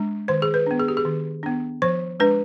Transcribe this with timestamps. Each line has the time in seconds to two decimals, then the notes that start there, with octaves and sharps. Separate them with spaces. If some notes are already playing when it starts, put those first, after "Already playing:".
Already playing: G#3 D4
0.28 D#3 C5
0.42 G#4
0.54 B4
0.66 B3 D4
0.80 G#4
0.88 G4
0.97 G#4
1.05 D#3
1.43 B3 D4
1.82 F3 C5
2.20 G#3 D4 B4